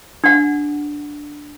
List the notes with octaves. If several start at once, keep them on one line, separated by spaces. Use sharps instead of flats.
D4 F#5